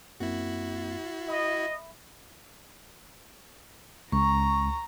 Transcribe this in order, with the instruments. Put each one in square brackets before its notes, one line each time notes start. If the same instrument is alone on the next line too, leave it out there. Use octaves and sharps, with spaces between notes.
[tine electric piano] F#2 A#3 C4 [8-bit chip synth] E4 F#4
[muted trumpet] D#5 [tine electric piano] E5 B5
[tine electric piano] C#2 [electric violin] A#5 [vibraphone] C#6